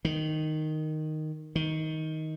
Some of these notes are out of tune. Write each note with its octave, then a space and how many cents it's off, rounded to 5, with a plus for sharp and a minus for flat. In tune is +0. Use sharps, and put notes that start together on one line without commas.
D#3 -5
D#3 +15